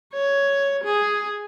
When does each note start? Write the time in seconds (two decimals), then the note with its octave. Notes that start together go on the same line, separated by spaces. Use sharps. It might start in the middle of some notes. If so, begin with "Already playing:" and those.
0.14 C#5
0.84 G#4